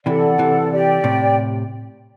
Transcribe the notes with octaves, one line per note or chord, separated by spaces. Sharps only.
C3 E3 A4 D5 F#5
C3 E3
G4 D5 G5
A2 C3